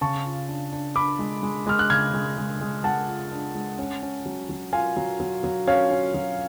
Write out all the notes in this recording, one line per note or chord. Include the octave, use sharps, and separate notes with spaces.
C#3 A5 C#6
F4
D4
D4
D4 B5 D6
G#3
G#3
G#3 F6
F#6
C#3 F6 G#6
G#3
G#3
G#3
G#3 F#5 A5
F4
D4
G#3
C#4
C#4
F#3
F#3
F4 F5 G#5
F#3
F#3
F#3
C#4 C#5 F5
C#4
F#3